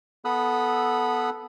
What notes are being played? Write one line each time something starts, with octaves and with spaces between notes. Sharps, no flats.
B3 A4 B5 D#6 E6 F#6